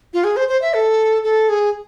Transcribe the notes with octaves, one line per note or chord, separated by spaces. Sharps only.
F4
G#4
C5
C5
E5
A4
A4
G#4